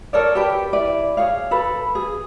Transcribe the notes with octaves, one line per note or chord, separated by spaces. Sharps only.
A4 A#4 C#5 D5
G4 B4 G5
E4 D5
G#4 C#5 F5
A4 B4 B5
G#4